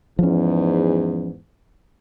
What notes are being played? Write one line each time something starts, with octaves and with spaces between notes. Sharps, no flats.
E2 G#2 F3 C#4